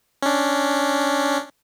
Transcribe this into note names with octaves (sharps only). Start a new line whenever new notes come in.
C#4 D4